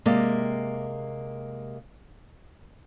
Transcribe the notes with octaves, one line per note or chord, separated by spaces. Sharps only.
C3 G#3 A#3 G4 D5